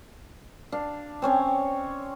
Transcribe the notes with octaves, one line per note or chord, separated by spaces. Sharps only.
D4 F5
C4 C#4 C#5